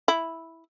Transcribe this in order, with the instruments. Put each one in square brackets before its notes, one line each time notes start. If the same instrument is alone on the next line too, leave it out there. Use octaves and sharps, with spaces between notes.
[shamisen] E4